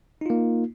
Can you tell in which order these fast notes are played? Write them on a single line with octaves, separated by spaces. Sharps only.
D#4 F4 A#3